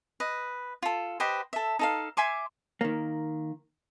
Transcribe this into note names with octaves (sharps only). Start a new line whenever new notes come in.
B4 D#5
F4 A4
G4 B4 C5 D#5
A4 E5
D#4 A4 F5
E5 G#5 C6 D6
D#3 A#3